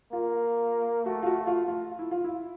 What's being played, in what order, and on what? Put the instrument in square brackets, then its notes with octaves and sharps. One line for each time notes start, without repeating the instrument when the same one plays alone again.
[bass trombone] A#3 [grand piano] F4
[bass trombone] A3 [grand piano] F#4
[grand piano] F4
F#4
F4
F4
E4
F4
E4